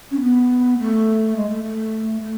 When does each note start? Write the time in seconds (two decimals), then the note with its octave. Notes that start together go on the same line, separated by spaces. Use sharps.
0.11 C#4
0.21 B3
0.79 A3
1.36 G#3
1.49 A3
1.64 A3
2.21 A3